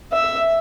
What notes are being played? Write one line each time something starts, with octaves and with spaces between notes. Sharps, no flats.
E5